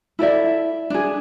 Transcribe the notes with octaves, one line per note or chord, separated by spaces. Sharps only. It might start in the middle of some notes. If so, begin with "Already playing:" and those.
E4 A4 D5 E5
D4 G#4